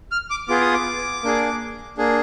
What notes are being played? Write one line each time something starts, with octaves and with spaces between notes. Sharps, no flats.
F6
D6
B3 F4 G#4 D6
D#6
D6
A#3 D4 G#4
A#3 D4 G#4